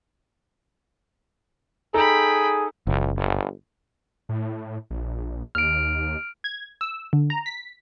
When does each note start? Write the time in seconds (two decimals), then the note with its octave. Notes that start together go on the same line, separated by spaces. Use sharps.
1.94 D#4 G#4 A4 G5 A#5 B5
2.87 F#1 C#2
3.17 G1
4.29 A2
4.90 A#1
5.55 D#2 F6 D7
6.44 G#6
6.81 E6
7.13 D3
7.30 A#5
7.46 B6